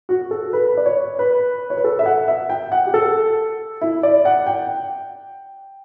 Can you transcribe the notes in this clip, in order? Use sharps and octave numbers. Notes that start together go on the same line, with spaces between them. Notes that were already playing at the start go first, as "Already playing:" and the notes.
F#4
A4
B4
D5
C#5
B4
C#5
B4
A4
E5
F#5
E5
G5
F#5
G4
A4
E4
D5
F#5
G5